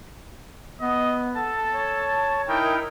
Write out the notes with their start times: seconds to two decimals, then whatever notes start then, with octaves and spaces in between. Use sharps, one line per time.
0.81 B3 D#5
1.35 A4 A5
1.72 C#5
2.48 D#4 E4 A#4 G5